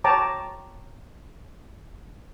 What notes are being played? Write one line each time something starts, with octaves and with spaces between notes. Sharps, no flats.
C#5 G5 A5 A#5 D6